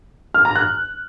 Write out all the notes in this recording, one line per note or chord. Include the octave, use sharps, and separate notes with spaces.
F6
A#5
F#6